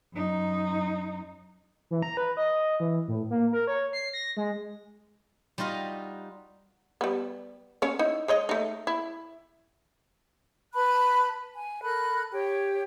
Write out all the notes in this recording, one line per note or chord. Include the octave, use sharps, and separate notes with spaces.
F#2 D#4
E3
A#5
B4
D#5
E3
A2
A#3
A#4
C#5
C7
A#6
G#3
G3 D#4 F4 F#4 D#5
G3 B3
C#4 C#5
D#4 E4
G#3 C#5 D#5
A3 D#4
E4
B4 A5 B5 F#6
G#5
A4 A#4 B5 F#6
G4 C#5 G5